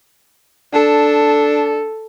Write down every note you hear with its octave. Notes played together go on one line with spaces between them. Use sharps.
D4 A4